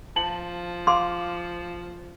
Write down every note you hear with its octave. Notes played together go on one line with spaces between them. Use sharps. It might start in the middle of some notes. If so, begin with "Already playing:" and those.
F3 A5 F#7
F5 C6 D6